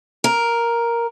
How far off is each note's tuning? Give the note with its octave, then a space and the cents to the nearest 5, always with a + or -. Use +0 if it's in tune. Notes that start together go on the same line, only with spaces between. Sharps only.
A#4 +5